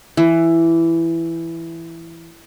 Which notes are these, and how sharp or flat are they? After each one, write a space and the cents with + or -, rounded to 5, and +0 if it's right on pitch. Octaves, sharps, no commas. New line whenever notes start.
E3 +10